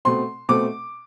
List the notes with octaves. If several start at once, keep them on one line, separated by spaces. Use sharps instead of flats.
B2 A3 C4 C6
B2 A3 C4 D6